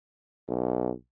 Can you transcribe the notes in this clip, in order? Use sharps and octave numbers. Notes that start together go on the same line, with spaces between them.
B1